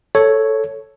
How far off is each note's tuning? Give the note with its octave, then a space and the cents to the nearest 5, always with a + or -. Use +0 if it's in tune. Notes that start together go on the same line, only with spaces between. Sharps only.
A4 +0 C#5 +0